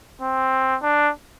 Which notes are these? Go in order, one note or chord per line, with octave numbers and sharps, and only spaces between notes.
C4
D4